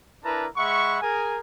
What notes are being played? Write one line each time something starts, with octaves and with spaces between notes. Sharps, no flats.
D4 E4 A#4 B4 A5 A#5
G#3 E5 F#5 B5 C#6
G#4 A#4 G#5